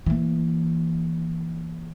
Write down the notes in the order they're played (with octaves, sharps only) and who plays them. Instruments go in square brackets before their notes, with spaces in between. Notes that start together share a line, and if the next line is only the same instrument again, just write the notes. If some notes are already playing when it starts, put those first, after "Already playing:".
[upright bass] E3 A#3